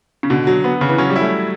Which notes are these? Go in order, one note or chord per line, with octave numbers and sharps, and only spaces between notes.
C#3
B2 D3
F#3
B3
C#3
E3
F#3 C#4
G3
E4
A3